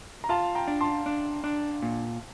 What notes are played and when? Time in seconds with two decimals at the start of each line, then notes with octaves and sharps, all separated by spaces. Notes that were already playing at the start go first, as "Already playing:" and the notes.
0.24 A#5
0.29 F4 F5 A5
0.55 G5 A#5
0.68 D4
0.81 A5 C6
1.06 D4
1.44 D4
1.82 A#2